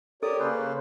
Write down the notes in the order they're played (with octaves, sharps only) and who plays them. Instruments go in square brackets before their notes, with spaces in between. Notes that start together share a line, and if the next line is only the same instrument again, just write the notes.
[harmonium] G4 A#4 C#5 [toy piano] A4 [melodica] D5 D#6
[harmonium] C#3 A#3 [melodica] C#4 B4 C5